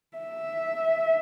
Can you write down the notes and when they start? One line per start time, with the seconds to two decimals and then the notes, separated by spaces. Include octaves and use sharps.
0.17 E5